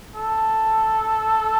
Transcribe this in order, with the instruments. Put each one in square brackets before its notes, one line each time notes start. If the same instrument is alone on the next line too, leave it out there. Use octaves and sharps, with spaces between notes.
[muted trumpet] A4